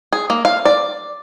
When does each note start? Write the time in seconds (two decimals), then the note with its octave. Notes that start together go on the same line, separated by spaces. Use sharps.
0.13 G#4
0.30 A#3
0.45 F5
0.65 D5